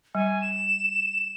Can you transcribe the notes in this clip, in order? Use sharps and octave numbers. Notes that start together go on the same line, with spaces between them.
G3 G#5
E7